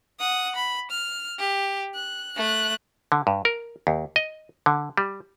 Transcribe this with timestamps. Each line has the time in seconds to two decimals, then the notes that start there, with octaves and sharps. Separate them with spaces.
0.20 F#5 D#6
0.55 B5
0.91 F6
1.39 G4
1.95 F#6
2.37 A3 F#6
3.12 D3
3.27 G2
3.45 A#4
3.87 D#2
4.16 D#5
4.66 D3
4.98 G3